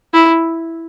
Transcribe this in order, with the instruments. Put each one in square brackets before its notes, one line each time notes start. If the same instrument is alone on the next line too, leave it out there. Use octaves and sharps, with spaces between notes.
[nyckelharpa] E4